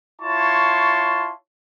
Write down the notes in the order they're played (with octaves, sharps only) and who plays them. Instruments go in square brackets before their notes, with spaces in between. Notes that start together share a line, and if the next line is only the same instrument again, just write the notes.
[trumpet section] E4 F4 C#5 A5 C6 C#6